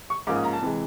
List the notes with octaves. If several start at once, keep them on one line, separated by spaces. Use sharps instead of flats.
C#6
G#2 F3 A#3 C#4 D6
D#6
A#5
A5
C3 E3 G#3